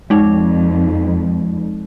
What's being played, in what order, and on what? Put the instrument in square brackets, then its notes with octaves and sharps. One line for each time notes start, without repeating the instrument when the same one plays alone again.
[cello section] F2 [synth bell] G#3 D#4